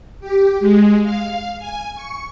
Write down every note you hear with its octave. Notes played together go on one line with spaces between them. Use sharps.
G4
G#3
F5
G#5
C#6